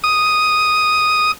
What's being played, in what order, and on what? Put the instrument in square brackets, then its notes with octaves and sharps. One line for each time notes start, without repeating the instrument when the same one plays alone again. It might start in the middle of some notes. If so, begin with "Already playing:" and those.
[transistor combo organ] D#6